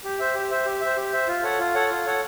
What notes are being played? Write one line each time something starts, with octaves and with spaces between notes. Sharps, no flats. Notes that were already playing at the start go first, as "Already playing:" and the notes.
G4
C5 E5
G4
C5 E5
G4
C5 E5
G4
C5 E5
F4
A4 C#5 F#5
F4
A4 C#5 F#5
F4
A4 C#5 F#5